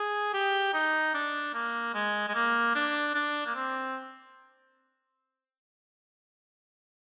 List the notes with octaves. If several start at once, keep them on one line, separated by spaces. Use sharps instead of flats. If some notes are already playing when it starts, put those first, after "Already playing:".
Already playing: G#4
G4
D#4
D4
A#3
G#3
G#3
A#3
D4
D4
A#3
C4